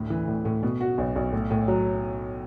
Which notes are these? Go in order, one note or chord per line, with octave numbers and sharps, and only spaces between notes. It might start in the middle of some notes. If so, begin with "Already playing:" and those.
Already playing: D2 A2
E3
A2
A2
B2
F#4
B1
B1
A2
A2
F#3